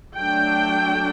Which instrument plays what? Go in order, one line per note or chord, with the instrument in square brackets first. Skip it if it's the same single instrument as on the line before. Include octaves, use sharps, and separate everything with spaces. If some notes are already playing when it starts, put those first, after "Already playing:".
[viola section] F#3 A3 D4 G5